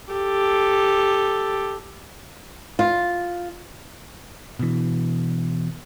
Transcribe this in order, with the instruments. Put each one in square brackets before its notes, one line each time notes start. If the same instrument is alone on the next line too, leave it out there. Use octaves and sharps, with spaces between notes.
[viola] G4 A4
[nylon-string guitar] F4
[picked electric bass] B2 E3